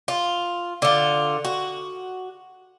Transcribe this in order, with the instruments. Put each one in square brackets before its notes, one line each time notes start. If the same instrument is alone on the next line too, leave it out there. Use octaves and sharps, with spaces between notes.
[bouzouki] F4
D3 F4
F#4